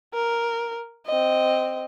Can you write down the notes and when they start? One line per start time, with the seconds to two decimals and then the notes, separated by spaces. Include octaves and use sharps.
0.14 A#4
1.06 C4 D#5